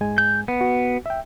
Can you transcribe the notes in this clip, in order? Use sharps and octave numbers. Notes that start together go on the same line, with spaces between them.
G#2 G#3 G#5
G6
B3
F#4
E5 G5